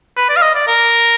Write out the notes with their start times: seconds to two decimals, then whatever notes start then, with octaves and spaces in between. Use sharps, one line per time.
0.17 B4
0.29 D5
0.37 F5
0.42 D#5
0.55 D5
0.68 A#4